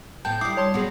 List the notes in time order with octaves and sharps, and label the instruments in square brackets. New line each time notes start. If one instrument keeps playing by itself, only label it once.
[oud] A2 B3 [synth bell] G5 A5 G6
[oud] G3 E4 [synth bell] D6 D#6 C7
[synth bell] C#5 A5 C6
[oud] A#2 F#3 [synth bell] B3 G#4